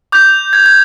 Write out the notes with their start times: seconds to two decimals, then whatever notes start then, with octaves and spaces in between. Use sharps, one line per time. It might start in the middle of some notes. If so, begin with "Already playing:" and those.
0.12 D6 G6
0.53 G#6
0.66 G#6